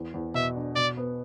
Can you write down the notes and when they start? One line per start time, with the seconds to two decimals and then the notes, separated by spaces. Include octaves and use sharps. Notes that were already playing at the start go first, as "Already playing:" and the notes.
Already playing: E2
0.14 E2
0.34 B2 E5
0.55 D4
0.76 B2 D5
0.97 B3